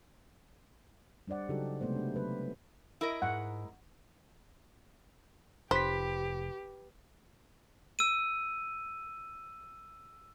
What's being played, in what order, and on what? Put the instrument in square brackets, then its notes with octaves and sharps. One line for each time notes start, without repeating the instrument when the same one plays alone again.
[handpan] G3 D4 C5 D5 F#5
C#3 F#3 D#4 F#4 G4 A4
C3 G#3 A3 B3 C5
D4
F#3 B4
[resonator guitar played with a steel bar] E4 A#4 D#5
[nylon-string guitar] G#2 [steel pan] F#5
[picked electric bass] F1 [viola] G4 [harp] B4 B6 [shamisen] C5
[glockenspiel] E6 D#7